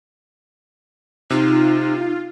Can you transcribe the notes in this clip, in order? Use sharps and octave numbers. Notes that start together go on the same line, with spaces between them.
C3 D#4 F4